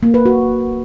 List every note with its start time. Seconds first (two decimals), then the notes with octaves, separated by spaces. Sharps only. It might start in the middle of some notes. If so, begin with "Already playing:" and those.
0.03 A#3
0.14 B4
0.26 F#4